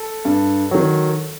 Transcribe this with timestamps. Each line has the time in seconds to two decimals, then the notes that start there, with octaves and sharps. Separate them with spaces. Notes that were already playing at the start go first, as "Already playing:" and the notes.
Already playing: A4
0.25 G2
0.71 D#3 F#3